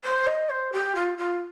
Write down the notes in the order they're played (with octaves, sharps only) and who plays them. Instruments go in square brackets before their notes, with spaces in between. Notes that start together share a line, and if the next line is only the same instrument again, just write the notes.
[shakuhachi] C5
D#5
C5
G4
F4
F4